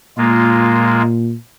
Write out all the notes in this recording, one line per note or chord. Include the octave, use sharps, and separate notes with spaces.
A#2 G#3 A#3 F4